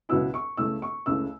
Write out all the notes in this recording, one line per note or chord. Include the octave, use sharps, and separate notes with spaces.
C#2 B2 F#3 B3 E4 E6
C#6
C#2 C#3 A3 E4 E6
C#6
C#2 C#3 A3 E4 E6